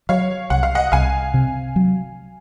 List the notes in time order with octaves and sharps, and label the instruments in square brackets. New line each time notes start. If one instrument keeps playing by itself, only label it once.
[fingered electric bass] F#3 [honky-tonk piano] C#5 F5
[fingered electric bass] C2 [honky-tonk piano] F#5
[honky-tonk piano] F5
D#5 F#5
[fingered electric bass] C2 [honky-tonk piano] F5 G#5
[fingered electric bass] C3
F#3